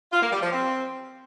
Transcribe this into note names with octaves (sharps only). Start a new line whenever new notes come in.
F4
A#3
G3
F3
C4